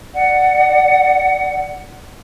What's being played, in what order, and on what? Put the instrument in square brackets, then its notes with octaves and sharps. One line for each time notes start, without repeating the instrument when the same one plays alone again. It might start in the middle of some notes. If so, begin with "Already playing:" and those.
[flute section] D5 F#5